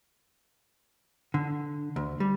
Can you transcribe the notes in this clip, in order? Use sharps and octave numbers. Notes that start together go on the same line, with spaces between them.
D3
D2
G3